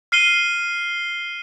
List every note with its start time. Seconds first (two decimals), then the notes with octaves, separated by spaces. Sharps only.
0.12 F6 C7 D#7 G7